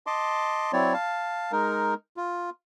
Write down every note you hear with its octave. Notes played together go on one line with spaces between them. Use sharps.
D#5 A5 C6 D6
F#3 C4 E4 C#5 D5
F5 A5
G#3 D#4 A#4
F4